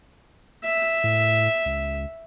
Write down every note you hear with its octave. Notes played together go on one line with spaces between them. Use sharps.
E5
A2
C#2